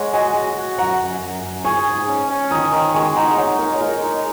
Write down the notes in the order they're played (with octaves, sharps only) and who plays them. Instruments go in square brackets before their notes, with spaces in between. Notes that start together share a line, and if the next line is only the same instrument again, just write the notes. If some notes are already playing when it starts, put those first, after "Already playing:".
Already playing: [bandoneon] G#3 [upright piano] C#5 F#5
[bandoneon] F#4 [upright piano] D#5 G#5
[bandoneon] F#4
F#4
[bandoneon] F#2 [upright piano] F#5 A#5
[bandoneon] F#2
F#2
F#2
[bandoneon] G#4 [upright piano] G#5 C#6
[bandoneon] G#2
C#4
C#4
[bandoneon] D#3 [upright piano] A#5 D#6
[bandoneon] D#3 [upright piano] A#5 D#6
[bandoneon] G#3 [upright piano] G#5 C#6
[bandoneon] D#4 [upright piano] F#5 A#5
[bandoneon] D#4 [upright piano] C#5 F#5
[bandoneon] G#3 [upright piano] A#4 D#5
[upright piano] C#5
[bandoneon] G#3 [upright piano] A#4
[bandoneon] D#4